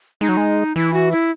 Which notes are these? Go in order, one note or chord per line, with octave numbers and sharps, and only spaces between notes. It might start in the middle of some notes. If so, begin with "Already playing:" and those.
G#3 D#4
F#3
G#3
E3 E4
F#4
E4